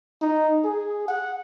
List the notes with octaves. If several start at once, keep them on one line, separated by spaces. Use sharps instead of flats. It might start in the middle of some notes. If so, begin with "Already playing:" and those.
D#4
G#4
F#5